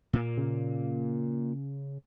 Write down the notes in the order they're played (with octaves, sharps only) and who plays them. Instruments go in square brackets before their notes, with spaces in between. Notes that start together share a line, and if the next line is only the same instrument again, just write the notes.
[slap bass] A#2 A#3
[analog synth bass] C#3